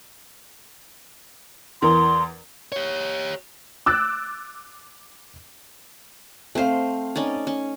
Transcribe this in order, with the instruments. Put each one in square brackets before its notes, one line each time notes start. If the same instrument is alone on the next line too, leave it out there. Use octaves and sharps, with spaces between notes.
[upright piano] E2 E3 A#4 [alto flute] C6
[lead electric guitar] G4 C#5
[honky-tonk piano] D6 E6 F#6 A6
[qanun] A3 C5 [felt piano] C4 F5
[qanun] C#4 D#4 D5
C#4